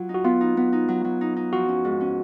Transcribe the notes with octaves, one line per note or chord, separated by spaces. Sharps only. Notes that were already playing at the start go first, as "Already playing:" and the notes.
Already playing: F#3 F4
D#4
F#4
B3 F4
D#4
B3
D#4
F#3
F#3
D#4
D#4
F3 F#4
C#4
G#2
C#4